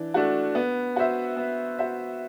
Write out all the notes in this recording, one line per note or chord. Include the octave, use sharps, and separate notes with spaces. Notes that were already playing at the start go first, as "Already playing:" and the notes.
Already playing: E3 D4
A3 D4 F#4
B3
F#4 C5 E5
B3
F#4 C5 E5